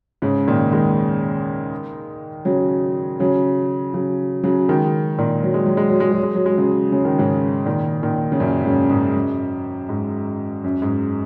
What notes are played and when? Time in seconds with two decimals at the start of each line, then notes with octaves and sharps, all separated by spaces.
0.22 G#2 C#3
0.48 A#2 D#3
0.72 D#3 G#3
2.45 C#3 F#3
3.20 C#3 F#3
3.94 C#3 F#3
4.43 C#3 F#3
4.69 D#3 G#3
5.18 A#2 D#3
5.43 F#3
5.54 G#3
5.66 F#3
5.77 G#3
5.89 F#3
6.00 G#3
6.11 F#3
6.23 G#3
6.35 F#3
6.46 G#3
6.58 C#3 F#3
6.92 C#3
7.05 D#3
7.18 G#2 C#3
7.66 A#2 D#3
8.03 A#2 D#3
8.32 C#3
8.40 F#2 A#2
8.65 G#2 C#3
8.90 G#2
9.16 F#2
9.89 G#2
10.64 F#2
10.82 G#2